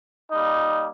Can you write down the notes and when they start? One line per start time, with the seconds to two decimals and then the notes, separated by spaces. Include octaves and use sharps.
0.30 G3 A#3 D#4